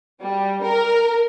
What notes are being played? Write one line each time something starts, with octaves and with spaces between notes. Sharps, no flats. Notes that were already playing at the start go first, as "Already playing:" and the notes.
G3
A#4